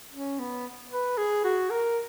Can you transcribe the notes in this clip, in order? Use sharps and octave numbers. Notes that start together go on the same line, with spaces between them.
C#4
B3
B4
G#4
F#4
A#4